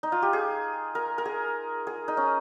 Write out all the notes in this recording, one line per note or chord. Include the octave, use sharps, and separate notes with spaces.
D#4
F4
G4
G#4
A#4
A#4
G#4
G#4
D#4
C#4